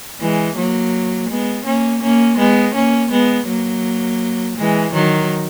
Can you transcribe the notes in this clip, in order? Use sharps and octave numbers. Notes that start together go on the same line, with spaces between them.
E3 G#3
F#3 A#3
G#3 B3
A#3 C#4
A#3 C#4
G#3 B3
A#3 C#4
G#3 B3
F#3 A#3
E3 G#3
D#3 F#3